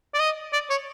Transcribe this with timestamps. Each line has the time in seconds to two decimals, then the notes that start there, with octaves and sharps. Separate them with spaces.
0.14 D5
0.19 D#5
0.53 D5
0.70 C#5